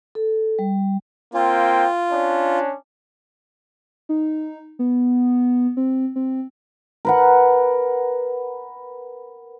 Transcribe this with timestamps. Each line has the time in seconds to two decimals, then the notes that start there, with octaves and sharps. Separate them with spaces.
0.15 A4
0.59 G3
1.34 A#3 C4 F4 G5
2.12 C#4 D4
4.09 D#4
4.79 B3
5.77 C4
6.16 C4
7.05 A#4 B4 F#5